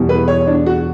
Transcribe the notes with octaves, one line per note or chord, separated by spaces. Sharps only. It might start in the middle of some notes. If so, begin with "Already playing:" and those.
Already playing: E2 B2 G3
B4
C#5
D4
F#4